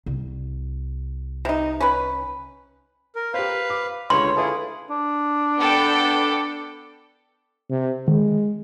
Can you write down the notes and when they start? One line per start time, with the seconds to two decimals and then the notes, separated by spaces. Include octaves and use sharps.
0.06 C2
1.45 C3 D#4
1.80 C#4 B4
3.16 A#4
3.34 G4 B4 C5 F5
3.70 D6
4.10 C#2 D3 B4 C#5 C6
4.37 E4 G#4 A4 B4 F5
4.90 D4
5.59 B3 A4 G5
7.70 C3
8.08 D#3 G#3